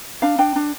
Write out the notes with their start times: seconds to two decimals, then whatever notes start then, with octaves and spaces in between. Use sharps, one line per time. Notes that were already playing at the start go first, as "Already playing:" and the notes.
0.22 D4 F5
0.39 D4 G5
0.56 D4